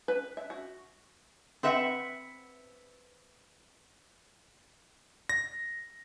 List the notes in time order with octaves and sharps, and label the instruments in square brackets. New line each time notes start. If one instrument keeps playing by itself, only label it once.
[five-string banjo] B4
E5
F#4
[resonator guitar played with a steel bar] C4 B4 E5 F#5
[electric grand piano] A#6